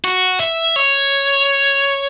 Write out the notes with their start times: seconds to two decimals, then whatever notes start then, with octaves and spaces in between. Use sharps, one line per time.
0.04 F#4
0.40 E5
0.76 C#5